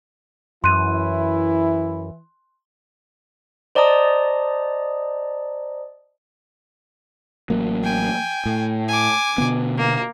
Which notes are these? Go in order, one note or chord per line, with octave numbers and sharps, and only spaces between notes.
F#2 E3 E4 C6 F#6 D#7
C5 D5 D#5 A5 A#5 D#6
A1 F#3 A#3
G5 G#5
A2
G#5 D6
B2 D3 B3
A#3